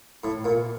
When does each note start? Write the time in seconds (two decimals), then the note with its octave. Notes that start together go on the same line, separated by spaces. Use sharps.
0.24 A2
0.44 A#2